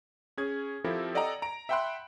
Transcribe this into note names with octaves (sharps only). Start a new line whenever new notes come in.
C#4 G#4 G#6
F3 C4 E4 G4 A4 A#4
A4 D5 D#5 F#5 G5 A#5
A#5 D7
E5 F#5 G5 B5 C6 F#6